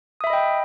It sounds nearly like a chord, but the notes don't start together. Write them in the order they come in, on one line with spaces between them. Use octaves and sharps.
D#6 E5 B5 D#5 G5